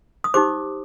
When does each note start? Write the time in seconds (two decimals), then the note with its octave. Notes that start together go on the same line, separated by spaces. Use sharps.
0.24 D#6
0.34 D#4 G4 C5 D6